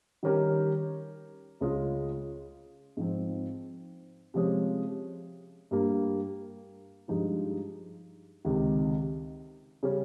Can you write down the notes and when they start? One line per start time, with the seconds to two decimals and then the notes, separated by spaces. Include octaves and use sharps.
0.23 D#3 G3 C#4 G4 A#4
1.61 C#2 C#3 G#3 C#4 F4
2.97 G#2 F3 C4
4.34 C3 F3 G#3 C#4
5.71 G2 G3 A#3
7.08 G2 F3 G#3 D#4 G4
8.45 C#2 C3 D#3
9.83 C#3 G3 C#4